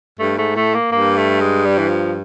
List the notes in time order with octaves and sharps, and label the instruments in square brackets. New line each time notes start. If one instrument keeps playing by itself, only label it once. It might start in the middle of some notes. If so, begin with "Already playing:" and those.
[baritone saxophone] G2 [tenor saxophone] A3
[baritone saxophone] G#2 [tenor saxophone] A3
[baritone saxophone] A2 [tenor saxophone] A3
[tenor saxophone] A#3
[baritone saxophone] G2 [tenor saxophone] A#3
[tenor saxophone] A3
G#3
G3
E3
F3